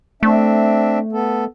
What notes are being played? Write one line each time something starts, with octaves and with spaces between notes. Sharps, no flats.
A3 C4 D4 E5
B3 A4